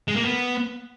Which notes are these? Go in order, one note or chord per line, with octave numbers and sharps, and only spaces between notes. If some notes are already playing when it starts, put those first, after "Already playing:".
G#3
A#3
B3